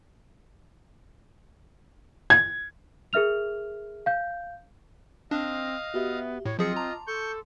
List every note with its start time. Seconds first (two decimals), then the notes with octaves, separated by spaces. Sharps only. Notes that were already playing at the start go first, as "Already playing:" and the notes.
2.30 G#6
3.13 G#4 A#4 E5 F6 F7
4.06 F5 G6
5.31 C4 D4 D#5 F5 F#6 A#6
5.94 B3 F#4 G4 E5
6.45 A2 C#5
6.59 F3 F#3 C4 F4 G#4 D#5 C#7
6.76 A5 A#5 C6 D6
7.07 A4 C#6 G6